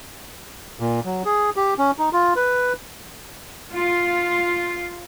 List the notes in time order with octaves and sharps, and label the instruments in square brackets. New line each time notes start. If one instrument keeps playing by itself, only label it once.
[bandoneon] A#2
F#3
G#4
G4
C#4
D#4
F4
B4
[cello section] F4